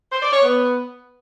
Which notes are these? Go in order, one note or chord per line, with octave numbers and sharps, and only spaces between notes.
C5
D5
C#5
B3